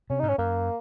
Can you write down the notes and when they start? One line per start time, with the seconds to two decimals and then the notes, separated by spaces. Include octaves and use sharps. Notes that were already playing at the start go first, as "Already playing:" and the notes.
0.10 C3 C#4
0.19 D#4
0.23 G#2
0.28 C#4
0.38 F#2 A#3